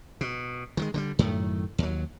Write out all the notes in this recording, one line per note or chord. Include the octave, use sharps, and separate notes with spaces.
B2
D#3 F3 G#3
D3 F#3 G3
F#2 A2 D#3 A3
D#2 F#3